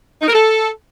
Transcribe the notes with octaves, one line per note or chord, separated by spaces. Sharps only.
D#4
A#4
A4